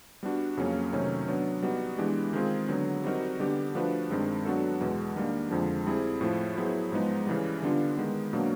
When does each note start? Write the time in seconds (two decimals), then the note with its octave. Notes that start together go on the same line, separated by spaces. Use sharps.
0.23 G3 B3 D4 F#4
0.57 F2 C#3 F#3 A#3 C#4
0.92 C3 D#3 F#3 A3 C#4
1.28 F#3 B3 D4
1.62 G3 B3 D#4 F#4
1.98 E3 G#3 B3 D4 G4
2.33 D#3 G#3 C4 F4 G#4
2.69 D3 F#3 B3
3.04 G3 C4 D#4 F#4 A#4
3.39 D3 G3 B3 D4 G4
3.75 F3 A3 D4 F#4 B4
4.10 G2 D#3 G#3 C4
4.45 F#3 B3 D4 F#4 A4
4.81 E2 B2 G#3
5.16 D#3 G3 A#3 D4
5.51 F2 D3 F3 G#3
5.87 G3 C4 E4 G#4
6.21 A2 F3 A3
6.57 F#3 B3 E4 G#4 C5
6.92 G#2 F3 G#3 B3 D#4
7.27 C#3 E3 G3
7.62 D3 G3 B3 D4 F4
7.97 D#3 G#3 B3
8.33 B2 F#3 A#3 D4